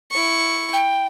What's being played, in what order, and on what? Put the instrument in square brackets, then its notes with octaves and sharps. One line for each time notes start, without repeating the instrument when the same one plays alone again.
[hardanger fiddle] E4 C#6
[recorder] G5